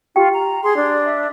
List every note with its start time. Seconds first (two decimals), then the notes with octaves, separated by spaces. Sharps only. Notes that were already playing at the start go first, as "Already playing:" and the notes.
0.16 F4 G4 G5
0.34 A#5
0.63 G#4 C6
0.76 D4
1.05 E5